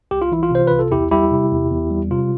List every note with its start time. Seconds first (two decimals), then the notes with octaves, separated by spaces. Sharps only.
0.11 C2 G4
0.22 F4
0.32 E3 E4
0.43 F4
0.51 C3 C5
0.67 C2 B4
0.79 A4
0.91 E2 E4 G4
1.11 G3 E4 G4
1.31 C3
1.52 E2
1.71 E2
1.91 G3
2.11 C3 F4